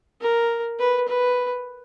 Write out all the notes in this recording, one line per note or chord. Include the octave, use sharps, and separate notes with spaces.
A#4
B4
B4